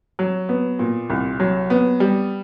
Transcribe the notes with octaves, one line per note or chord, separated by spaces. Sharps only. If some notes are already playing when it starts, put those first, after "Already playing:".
F#3
B3
A#2
C2
F#3
B3
G3